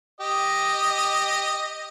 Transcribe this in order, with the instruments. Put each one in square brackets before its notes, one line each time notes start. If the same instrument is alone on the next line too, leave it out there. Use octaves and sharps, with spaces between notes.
[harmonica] G4 D#5